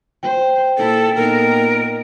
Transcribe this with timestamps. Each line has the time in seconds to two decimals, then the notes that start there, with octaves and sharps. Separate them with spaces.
0.23 C5 G5
0.78 A#2 E4 A4
1.15 A#2 B3 D#4 A#4